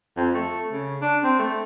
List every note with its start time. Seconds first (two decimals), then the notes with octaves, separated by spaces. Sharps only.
0.17 F2
0.34 A3
0.72 C#3
1.01 D4
1.23 C4
1.39 A3